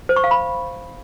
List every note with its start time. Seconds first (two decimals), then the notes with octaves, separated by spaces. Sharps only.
0.09 C5
0.16 C#6
0.24 F5
0.31 B5